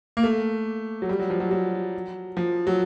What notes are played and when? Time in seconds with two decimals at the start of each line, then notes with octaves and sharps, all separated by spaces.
0.17 A#3
0.23 A3
1.02 F#3
1.09 G3
1.20 F#3
1.30 F3
1.40 F#3
1.51 F#3
2.37 F3
2.67 F#3